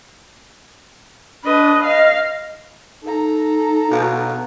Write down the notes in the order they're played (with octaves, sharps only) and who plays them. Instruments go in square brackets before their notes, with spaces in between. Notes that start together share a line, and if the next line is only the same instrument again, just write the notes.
[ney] D4 [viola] B4 D#5
[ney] D#5 [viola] F5
[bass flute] D#4 [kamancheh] A4 A#5
[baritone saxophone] B2 [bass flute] F5